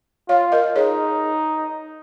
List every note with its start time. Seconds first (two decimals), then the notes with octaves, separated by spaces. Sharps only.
0.29 F4 C#5 F5
0.52 A#4 D#5
0.76 D#4 G#4 C#5